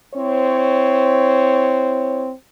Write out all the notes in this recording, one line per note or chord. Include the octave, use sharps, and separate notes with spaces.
C4 E4 C5 C#5